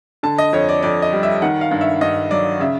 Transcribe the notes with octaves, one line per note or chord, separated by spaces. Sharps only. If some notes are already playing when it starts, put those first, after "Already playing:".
D3 A5
D#5
F2 C#5
D5
F2 D5
D#5
G3
E5
D#3 F#5
F5
G2
E5
G2 D#5
F#3 D5
C#3 E5